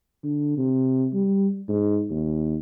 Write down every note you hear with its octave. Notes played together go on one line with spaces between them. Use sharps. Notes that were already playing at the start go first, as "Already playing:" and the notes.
D3
C3
G3
G#2
D#2